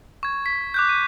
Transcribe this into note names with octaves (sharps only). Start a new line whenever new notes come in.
C#6 G#6
B6
D6 F#6 G6
D#7